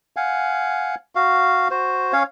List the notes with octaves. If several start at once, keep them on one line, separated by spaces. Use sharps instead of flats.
F5 F#5 G#5
F#4 F5
F#4 C5
C#4 C#5 F5